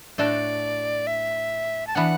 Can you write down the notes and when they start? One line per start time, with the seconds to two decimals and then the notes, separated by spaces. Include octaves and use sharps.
0.18 A2 A3 D4 F#4 A4 D5
1.07 E5
1.87 A5
1.95 E3 B3 D4 F#5